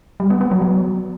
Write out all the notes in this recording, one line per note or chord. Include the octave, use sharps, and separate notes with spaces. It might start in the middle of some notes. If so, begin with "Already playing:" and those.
G3
B3
B3
F#3
F#3